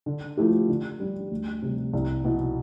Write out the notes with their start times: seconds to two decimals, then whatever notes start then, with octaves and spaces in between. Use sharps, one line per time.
0.06 D3
0.37 F3 A3 E4 G4
0.69 D3
1.00 G3 D4 G4
1.31 D2
1.62 C3 G3
1.93 C2
2.24 B2 B3 E4